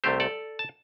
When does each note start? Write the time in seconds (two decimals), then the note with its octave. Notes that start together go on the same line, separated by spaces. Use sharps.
0.04 C2 C3 A3 C4 G4 C5
0.20 A4 D5
0.59 A5